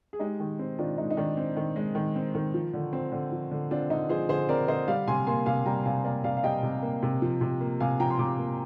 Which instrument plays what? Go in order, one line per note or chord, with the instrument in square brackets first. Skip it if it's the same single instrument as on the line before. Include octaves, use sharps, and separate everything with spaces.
[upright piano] G#4
G#3 D#4 G4
D#3
C4
D#3 D4 F4
G#3 D#4
D#4
D#3 D4
C4
D#3
G#3
D#3
C4
D#3
F3
D3
C4
D3
F3
D3
C4 D4 F4
D3 D#4
F3 G#4 C5
D3 G#4 C5
C4 A#4 D5
D3 C5 D#5
G3 D5 F5
C3 G#5 C6
A#3 G#5 C6
C3 F5 G#5
G3 G5 A#5
C3 F5 G#5
A#3 D5 F5
C3 D5 F5
F5
G3 D#5 G5
C3
A#3
C3
F3
C3
A#3
C3 F5 G#5
F3 G5 A#5
C6
C3 A#5 D6
A#3